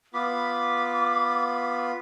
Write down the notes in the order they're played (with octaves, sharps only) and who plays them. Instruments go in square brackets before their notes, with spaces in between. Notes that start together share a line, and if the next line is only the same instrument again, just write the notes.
[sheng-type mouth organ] B3 F4 B5 [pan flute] D6